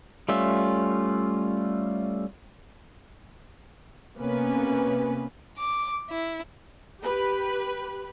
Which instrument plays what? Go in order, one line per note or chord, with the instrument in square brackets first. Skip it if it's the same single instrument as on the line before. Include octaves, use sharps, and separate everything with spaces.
[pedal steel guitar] G3 A3 C#4 F4 E5
[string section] C3 A#3 B3 C#4 B4
[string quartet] D6
E4
[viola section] G4 B4